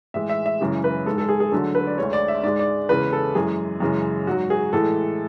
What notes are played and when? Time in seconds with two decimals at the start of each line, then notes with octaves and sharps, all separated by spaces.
0.14 A2 E3 G#3 E5
0.29 E5
0.46 E5
0.61 F#2 C#3 E3 G#3
0.84 B4
1.06 G#3 A4
1.10 G#2
1.18 A4
1.29 G#4
1.40 G#4
1.52 D2 D3 F#3 A4
1.75 B4
1.87 D5
1.98 D2 D3 G#3 C#5
2.13 D5
2.28 E5
2.43 G#2 G#3 D5
2.59 D5
2.89 E2 C#3 G#3 B4
3.13 A4
3.35 F#2 E3 G#3 G#4
3.80 F#2 C#3 E3 G#3
4.27 G#2 F#3 F#4
4.50 G#4
4.73 A2 E3 G#3 A4